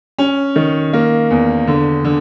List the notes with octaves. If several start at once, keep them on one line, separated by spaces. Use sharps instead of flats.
C#4
D#3
A#3
E2
D3
D3